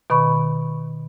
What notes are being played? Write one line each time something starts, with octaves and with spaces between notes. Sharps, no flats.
B2 D#3 B5 C#6